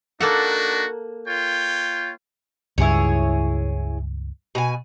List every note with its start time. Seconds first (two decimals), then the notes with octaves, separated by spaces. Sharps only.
0.20 A#3 D4 D#4 F#4 A4 F#5
1.26 F4 C#5 G5
2.78 C#2 G2 E4 G#4 C#5
4.55 B2 G#5